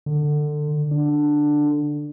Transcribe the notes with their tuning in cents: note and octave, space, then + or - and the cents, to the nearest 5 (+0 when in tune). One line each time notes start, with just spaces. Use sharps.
D3 +20
D3 +10